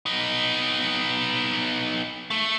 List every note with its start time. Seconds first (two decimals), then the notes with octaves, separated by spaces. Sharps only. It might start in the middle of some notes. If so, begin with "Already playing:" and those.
0.06 B3 D#4
2.30 A3